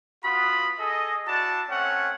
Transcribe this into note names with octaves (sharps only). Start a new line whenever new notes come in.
B3 F4 F#4 B5 D#6
G#4 A4 D#5
D4 E4 F#4 A5
A3 C4 C#4 C#5 F#5